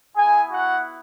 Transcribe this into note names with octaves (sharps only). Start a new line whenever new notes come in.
B3 E4 G#4 G#5
F#4 F#5